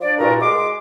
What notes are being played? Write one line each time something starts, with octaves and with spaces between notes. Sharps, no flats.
F3 D4 D5
G2 A#2 E4 F#4 A#4
G#3 C6 D6